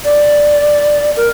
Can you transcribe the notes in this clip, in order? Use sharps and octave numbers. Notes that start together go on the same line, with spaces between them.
D5
A#4